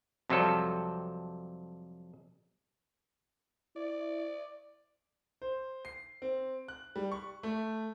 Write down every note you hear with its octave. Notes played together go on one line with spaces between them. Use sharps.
F2 C3 F#3 G3 A4
E4 D5
C5
C7
C4
F#6
G3
C#6
A3